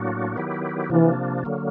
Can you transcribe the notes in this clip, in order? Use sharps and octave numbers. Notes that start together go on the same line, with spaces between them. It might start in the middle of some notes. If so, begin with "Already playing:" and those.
Already playing: A2 F#3 A#3 D4 F#4
D#3 F#3 B3 E4 G4
C3 E3 F3 A#3 D4
D3 F#3 A#3